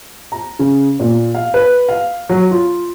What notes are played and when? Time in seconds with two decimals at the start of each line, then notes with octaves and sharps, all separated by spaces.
0.32 A#5
0.59 C#3
1.00 A#2
1.34 F5
1.54 B4
1.89 F5
2.29 F#3
2.51 F4